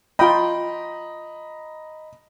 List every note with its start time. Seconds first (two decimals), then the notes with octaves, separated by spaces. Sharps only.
0.19 F4 D#5 G5 A#5 B5